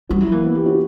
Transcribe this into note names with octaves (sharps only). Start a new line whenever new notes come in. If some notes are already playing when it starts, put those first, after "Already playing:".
G3 F#4
F#3 E4
E3 A#3
B3
G4
F#4